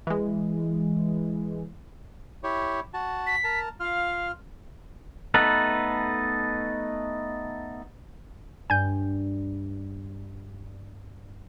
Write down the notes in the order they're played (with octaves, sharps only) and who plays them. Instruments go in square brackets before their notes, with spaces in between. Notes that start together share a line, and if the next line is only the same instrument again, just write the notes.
[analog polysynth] E3 G#3
[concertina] E4 G4 C#5
F#4 A5
[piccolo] B6
[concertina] A#4 A5
[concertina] F4 F6 [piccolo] F5
[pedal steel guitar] A3 B3 D#4 A4 B4
[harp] G2 [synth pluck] G#5 G6